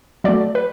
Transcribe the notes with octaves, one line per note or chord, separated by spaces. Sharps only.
F#3 A3 D5
B4